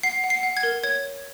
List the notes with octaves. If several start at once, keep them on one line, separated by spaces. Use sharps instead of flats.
F#5 C7
F#5
C7
F#5
G#6
A#4
C#5 G#6